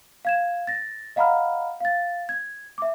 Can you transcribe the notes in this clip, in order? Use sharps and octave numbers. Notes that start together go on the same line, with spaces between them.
F5 G#6 E7
A6 A#6
D#5 F5 F#5 A#5 B5 F6
F5 A6
G#6
E5 D6